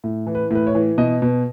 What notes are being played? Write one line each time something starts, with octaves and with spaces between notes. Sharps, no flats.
A2
E3
B4
A2 B4
C#5
E3
B2 D#5
B2